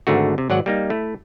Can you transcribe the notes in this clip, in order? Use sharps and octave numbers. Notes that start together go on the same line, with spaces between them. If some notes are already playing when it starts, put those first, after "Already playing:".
G#1 G#2 D3 A3 F#4
C3
G#1 F#3 D5 F#5
G3 A#3 D#4
A3 E4